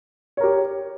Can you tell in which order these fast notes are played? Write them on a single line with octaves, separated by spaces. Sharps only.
C#5 A#4 G4